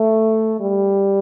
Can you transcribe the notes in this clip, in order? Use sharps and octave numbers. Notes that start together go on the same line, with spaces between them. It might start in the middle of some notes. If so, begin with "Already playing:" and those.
Already playing: A3
G3